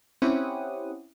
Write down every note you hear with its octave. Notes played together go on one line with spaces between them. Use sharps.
C4 C#4 E4 G4 F#5 D#6